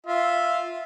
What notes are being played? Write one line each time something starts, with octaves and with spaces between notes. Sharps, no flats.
F4 E5